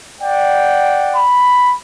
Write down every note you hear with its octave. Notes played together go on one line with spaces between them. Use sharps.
D5 F#5 G5
B5